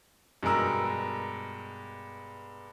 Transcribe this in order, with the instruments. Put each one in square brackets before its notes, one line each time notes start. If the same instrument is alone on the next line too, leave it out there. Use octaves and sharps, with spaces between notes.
[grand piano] G2 B2 G#3 A#4 E6